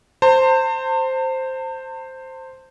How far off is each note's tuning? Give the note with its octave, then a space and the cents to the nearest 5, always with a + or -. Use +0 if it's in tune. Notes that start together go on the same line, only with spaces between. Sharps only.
C5 +0 A5 +40